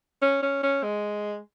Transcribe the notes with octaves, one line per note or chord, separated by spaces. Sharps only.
C#4
C#4
C#4
G#3